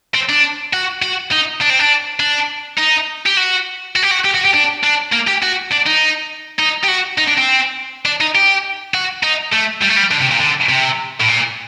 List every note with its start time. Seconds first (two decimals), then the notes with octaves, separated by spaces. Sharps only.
0.15 C4
0.29 D4
0.73 F#4
1.02 F#4
1.32 D#4
1.61 D4
1.70 C4
1.79 D4
2.20 D4
2.78 D#4
3.26 G4
3.37 F#4
3.96 F#4
4.03 G4
4.11 F#4
4.25 G4
4.35 F#4
4.45 G4
4.54 D4
4.83 D4
5.12 A#3
5.27 G4
5.42 F#4
5.71 D4
5.86 D#4
6.59 D#4
6.84 G4
6.88 F#4
7.18 D#4
7.28 D4
7.38 C4
8.06 D4
8.21 D#4
8.35 G4
8.94 F#4
9.23 D#4
9.52 A3
9.81 G3
9.89 A3
9.96 G3
10.11 D3
10.21 C3
10.31 A#2
10.40 D3
10.69 C3
11.21 A2
11.29 A#2